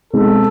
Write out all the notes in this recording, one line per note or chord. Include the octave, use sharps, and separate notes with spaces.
B2 G#3 C4 D#4 A4